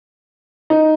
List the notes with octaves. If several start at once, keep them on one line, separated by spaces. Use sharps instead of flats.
D#4